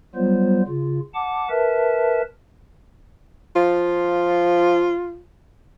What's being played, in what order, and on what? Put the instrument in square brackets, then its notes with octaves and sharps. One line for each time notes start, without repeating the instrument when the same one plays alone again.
[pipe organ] F#3 G3 B3 F4 C5
C#3 F4
F#5 A5 D6
A#4 B4 E5 A5
[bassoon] F3 [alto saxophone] F4